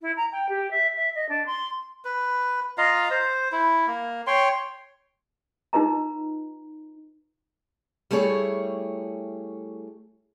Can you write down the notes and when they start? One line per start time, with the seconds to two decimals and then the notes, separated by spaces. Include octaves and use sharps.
0.01 E4
0.16 A#5
0.32 G5
0.49 G4
0.71 E5
0.96 E5
1.15 D#5
1.29 D4
1.46 C6
2.05 B4
2.78 F4 D#5 F5 A#5
3.11 C5
3.52 E4
3.87 A#3
4.27 C#5 G5 C6
5.73 D#4 F4 B4 D#5 A#5
8.11 G3 A3 E4 G#4 C#5